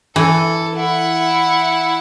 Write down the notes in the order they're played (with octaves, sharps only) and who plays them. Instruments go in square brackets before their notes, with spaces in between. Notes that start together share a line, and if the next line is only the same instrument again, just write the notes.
[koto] E3 [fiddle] A4
[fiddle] E4 F#5